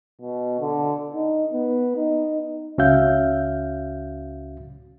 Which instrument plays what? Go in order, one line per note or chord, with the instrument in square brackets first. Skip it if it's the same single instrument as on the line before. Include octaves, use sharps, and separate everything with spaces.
[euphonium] B2
D3
D#4
B3
D#4
[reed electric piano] C#2 C#4 F#4 E5 F5 G6